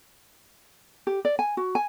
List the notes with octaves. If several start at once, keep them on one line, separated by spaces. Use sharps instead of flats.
G4
D5
G#5
F#4
G#5